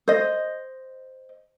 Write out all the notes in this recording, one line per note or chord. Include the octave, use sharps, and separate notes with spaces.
C5 D#5